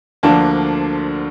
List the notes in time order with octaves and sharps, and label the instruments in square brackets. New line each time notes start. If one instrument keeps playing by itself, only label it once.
[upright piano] D2 D3 F3 A#3 D4 A5